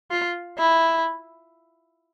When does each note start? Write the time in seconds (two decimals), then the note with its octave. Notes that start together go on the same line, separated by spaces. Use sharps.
0.11 F4
0.58 E4